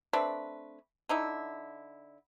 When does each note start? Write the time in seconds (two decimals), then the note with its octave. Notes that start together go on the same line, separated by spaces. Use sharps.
0.13 A3 C4 D4 B4
1.09 D3 D#4 E4